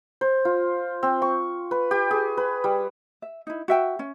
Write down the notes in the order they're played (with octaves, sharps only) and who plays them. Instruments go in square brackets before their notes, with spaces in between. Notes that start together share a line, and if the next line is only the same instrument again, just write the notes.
[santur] C5
F4
C4
C#6
B4
G4
G#4
B4
G3
[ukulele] E5
D#4 E4
F#4 E5 G5
C#4